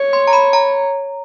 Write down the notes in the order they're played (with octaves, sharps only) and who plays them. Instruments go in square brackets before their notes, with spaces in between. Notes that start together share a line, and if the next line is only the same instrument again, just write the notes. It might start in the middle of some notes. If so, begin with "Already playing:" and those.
Already playing: [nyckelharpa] C#5
[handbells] C6
A#5
B5
A#5